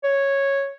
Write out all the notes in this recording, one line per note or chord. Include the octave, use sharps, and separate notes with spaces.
C#5